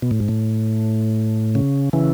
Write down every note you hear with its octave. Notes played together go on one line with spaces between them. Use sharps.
B2
A2
G#2
A2
C#3
C#3 E3